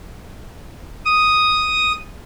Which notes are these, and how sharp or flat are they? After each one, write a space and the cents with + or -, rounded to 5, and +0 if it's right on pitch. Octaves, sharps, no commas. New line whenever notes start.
D#6 +0